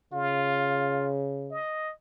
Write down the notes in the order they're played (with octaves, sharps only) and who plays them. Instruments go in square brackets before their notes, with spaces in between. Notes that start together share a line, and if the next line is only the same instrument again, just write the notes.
[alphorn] C#3 [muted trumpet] F4
[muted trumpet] D#5